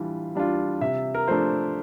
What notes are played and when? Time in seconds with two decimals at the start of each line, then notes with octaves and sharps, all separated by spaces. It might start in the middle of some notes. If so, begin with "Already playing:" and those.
Already playing: E3 G3 D4 F4
0.35 G3 D4 F4
0.81 C3 E5
1.15 A#4
1.27 F3 A3 D4 C5